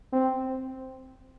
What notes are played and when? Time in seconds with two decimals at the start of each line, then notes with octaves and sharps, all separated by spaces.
0.13 C4